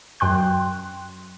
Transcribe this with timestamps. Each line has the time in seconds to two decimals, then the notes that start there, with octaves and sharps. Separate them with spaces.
0.20 F#2 G5 C6 F#6